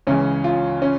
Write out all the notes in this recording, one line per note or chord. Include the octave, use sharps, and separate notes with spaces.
C#2 C#3 E3 C#4
F4
C#4